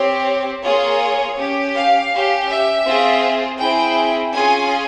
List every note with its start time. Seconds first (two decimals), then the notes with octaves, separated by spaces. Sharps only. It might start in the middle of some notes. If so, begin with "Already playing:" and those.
Already playing: C4 G4 C#5
0.63 A#3 F4 G#4 C#5
1.38 C#4 G4
1.75 F5
2.11 C#4 G4
2.49 E5
2.86 C4 F4 G#4
3.60 C4 E4 G#4 G5
4.33 C#4 F4 G#4 G#5